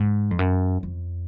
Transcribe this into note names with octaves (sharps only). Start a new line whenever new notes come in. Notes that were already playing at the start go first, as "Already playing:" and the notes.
Already playing: G#2
F2
F#2
F2